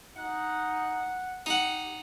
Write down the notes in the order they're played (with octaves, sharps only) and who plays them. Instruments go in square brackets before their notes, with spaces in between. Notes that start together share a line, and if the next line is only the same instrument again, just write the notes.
[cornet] D#4 [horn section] F#5
[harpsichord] D#4 F#5 [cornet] G4